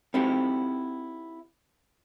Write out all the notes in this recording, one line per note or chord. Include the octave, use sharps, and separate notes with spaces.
C4 D#4 E4 F#4 G4 A4